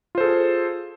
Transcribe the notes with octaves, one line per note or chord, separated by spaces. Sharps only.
F4 G#4 A4 C5